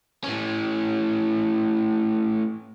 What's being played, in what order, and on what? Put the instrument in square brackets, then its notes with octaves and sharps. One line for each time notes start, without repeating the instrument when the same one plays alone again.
[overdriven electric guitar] A2 C#4